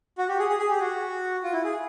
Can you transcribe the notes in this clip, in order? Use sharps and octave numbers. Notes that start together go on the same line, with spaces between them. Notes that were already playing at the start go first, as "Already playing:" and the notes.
F#4
G4
G#4
G#4
G#4
G4
F#4
F4
E4
G#4